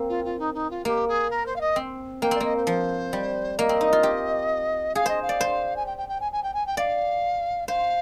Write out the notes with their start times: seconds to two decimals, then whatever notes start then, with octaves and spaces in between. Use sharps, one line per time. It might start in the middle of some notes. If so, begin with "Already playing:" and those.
Already playing: A#3 C4
0.09 F4
0.24 F4
0.39 D#4
0.54 D#4
0.70 F4
0.85 A#3 G4
1.08 G#4
1.30 A#4
1.46 C5
1.56 F5
1.61 D#5
1.76 C4
2.22 A#3 G5
2.31 C4 D5
2.40 A#3 D#5
2.56 C5
2.67 F3 C5
3.13 G3
3.58 A#3 D#5
3.69 C4
3.81 D#4
3.93 F4
4.03 G4
4.95 G#4 F5
5.06 C5 D#5
5.22 F5
5.29 D5
5.41 C5
5.76 G#5
5.86 G5
5.97 G5
6.09 G5
6.21 G#5
6.32 G#5
6.43 G5
6.54 G#5
6.66 G5
6.77 D5 F5
7.68 C5 F5